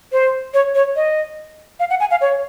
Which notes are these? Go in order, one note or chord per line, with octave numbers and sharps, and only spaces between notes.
C5
C#5
C#5
D#5
F5
F#5
G#5
F5
C#5